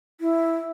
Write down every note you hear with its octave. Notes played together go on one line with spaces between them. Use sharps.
E4